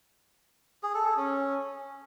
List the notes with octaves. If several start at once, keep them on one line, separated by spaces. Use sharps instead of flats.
G#4
A4
A4
C#4